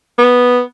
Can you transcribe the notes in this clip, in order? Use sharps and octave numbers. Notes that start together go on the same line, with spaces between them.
B3